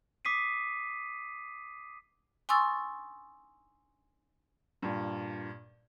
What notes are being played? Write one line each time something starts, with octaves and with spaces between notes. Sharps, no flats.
D6 D#6 B6 C7 D#7
G#5 C6 C#6 D#6 E6 A6
G2 A#2